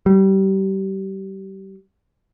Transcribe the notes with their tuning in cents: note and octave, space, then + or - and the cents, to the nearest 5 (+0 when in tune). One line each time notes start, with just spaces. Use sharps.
G3 -30